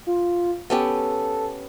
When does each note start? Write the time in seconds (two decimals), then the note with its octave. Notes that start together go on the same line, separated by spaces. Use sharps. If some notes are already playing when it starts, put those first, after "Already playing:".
0.07 F4
0.70 B3 C#4 G4 A4